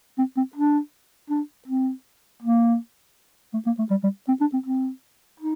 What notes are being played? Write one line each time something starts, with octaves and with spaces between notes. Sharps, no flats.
C4
C4
D4
D4
C4
A#3
A3
A#3
A3
G3
G3
C4
D4
C4
C4
D#4